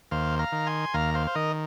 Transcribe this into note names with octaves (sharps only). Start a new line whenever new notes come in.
D#2 C5 F5
F5 A#5
D#3
G#5 C6
D#2 F5 A#5
C5 F5
C5
D#3 A#4 D#5